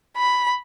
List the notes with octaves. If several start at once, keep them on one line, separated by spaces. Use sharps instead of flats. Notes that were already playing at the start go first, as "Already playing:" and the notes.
B5